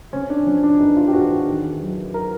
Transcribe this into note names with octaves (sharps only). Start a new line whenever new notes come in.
C3 C#4
D4
F3 C#4
D4
E2 D#4
F4
G4
E2 F#4
D#3
F#3
A#4